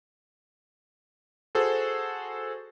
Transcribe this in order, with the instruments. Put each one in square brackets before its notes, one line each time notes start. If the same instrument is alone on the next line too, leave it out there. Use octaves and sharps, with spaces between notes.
[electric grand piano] F#4 G#4 A4 C5